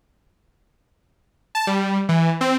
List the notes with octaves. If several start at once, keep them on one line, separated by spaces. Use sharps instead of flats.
A5
G3
E3
C4